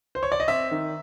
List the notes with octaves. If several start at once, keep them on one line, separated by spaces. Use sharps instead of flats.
C5
C#5
D5
D#5
C4 E5
D#3